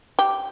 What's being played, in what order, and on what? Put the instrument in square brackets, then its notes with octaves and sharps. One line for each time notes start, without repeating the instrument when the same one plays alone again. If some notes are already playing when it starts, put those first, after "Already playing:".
[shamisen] G4